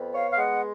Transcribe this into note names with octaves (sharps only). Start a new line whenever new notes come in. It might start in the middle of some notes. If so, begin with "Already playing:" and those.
Already playing: F2 B3
C#5 F5
F5
G#3 D#5 F#5